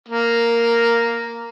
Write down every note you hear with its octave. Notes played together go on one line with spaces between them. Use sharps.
A#3